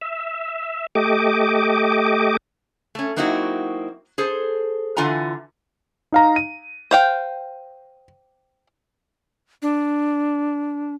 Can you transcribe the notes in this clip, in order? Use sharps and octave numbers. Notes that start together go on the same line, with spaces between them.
E5
A3 G4 D#5 D6
A3 C#4
F#3 A#3 C4 D#4 E4 F#4
G#4 A4 C5
D3 E3 F4 F#5 G#5 A#5
D#4 F5 A#5
D#7
C5 F5 G5
D4